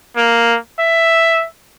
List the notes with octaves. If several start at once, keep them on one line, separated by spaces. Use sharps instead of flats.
A#3
E5